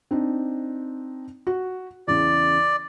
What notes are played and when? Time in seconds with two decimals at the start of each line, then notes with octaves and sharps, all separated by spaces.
0.11 C4 D4 D#4
1.47 F#4
2.08 E2 C#3 D5